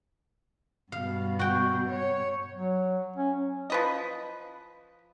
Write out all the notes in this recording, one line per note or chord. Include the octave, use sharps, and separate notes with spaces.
G2 B2 F5
F#4 G5
C#5
F#3
C#4
F3 B4 D#5